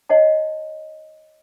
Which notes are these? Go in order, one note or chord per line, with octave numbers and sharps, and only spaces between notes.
C#5 D#5 F#5 A5